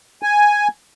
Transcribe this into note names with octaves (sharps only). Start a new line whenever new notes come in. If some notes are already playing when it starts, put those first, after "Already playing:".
G#5